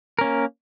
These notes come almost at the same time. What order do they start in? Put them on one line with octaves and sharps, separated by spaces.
A#4 C#4 A#3